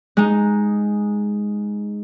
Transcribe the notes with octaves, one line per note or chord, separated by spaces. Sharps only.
G#3 D#4